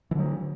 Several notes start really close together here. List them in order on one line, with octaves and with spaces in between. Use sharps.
E3 D3 F#3